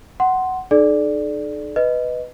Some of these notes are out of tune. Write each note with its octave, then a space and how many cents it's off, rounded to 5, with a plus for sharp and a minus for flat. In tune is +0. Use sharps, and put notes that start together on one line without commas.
F#5 +10 C6 +0
D#4 -35 A4 -40 D5 +0
B4 +5 D#5 +0